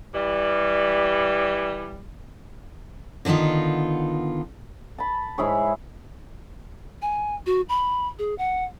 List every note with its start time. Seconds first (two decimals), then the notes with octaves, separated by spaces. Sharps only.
0.14 E3 G3
3.25 D3 D#3 B3 D#4 F4
4.98 A5 B5
5.38 G#2 E4 G#4 C#5
7.02 G#5
7.46 F#4
7.69 B5
8.19 G#4
8.38 F#5